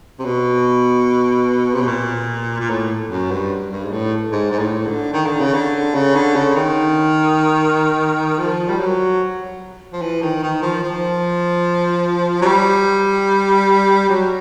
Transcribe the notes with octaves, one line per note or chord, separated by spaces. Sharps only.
C3
B2
C3
B2
A#2
A#2
A2
F#2
G2
G2
G#2
A2
G#2
G#2
A2
D3
D#3
D3
C#3
D3
C#3
D3
C#3
D#3
F3
G3
F#3
F3
E3
D#3
D#3
F3
F3
F#3
G3
F#3